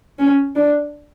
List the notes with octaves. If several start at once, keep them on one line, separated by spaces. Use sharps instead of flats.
C#4
D4